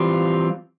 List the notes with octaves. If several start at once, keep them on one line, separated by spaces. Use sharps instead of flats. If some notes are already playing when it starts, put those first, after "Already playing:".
Already playing: E3 G3 C4 F4